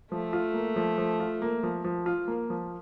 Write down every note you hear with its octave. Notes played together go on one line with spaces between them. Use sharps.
F3 A3
F4
A#3
F3
F3
F4
A#3
F3
F3
F4
A#3
F3